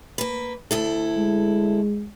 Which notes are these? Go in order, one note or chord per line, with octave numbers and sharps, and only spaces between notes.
A#3 B4
D2 E4 A4
G#3